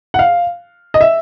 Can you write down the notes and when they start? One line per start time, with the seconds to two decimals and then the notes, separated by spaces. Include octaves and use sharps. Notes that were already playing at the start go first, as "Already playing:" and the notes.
0.14 F#5
0.19 F5
0.94 D#5
1.01 E5